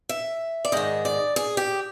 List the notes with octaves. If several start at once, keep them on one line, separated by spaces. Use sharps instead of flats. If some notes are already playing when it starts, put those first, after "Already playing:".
E5
D5
G#2 D#3 D#5
D5
G#4
G4